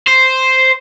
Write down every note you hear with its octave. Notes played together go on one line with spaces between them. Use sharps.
C5